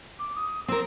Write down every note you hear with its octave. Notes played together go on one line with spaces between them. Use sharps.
D6
D#6
C4 A#4 E6